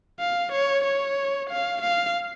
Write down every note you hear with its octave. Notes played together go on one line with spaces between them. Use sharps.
F5
C#5
C#5
F5
F5